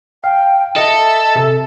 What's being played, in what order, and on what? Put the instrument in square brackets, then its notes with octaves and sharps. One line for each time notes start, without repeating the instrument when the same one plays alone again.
[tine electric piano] F5 [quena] G5
[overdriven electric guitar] A4 [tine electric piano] D#5 [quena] E5
[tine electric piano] C3 A4 A5